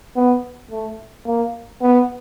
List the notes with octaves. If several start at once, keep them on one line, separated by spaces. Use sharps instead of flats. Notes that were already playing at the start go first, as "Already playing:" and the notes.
B3
A3
A#3
B3